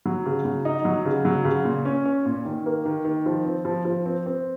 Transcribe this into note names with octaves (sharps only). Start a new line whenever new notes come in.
F#3
C#3
F#3
D#4
F#3
C#3
F#3
C#3
A#2
C#4
C#4
A#2
D#3
A#3
D#3
D#3
F3
C4
F3
F3
C4
C4